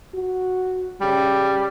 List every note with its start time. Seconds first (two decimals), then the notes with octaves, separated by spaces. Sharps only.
0.14 F#4
1.01 C#3 G3